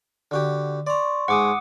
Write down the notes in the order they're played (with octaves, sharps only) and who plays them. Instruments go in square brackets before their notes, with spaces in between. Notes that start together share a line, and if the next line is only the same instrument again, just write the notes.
[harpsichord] D3 F#4 G4
[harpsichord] D5 A#5 [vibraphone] C6 C#6
[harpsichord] G#2 G#3 [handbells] F#5 D6 D#6